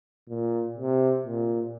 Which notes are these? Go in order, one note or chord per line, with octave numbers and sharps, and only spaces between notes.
A#2
C3
A#2